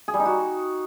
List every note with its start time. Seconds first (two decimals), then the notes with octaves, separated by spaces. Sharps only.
0.08 G#4
0.14 G3
0.20 D#4
0.26 F#4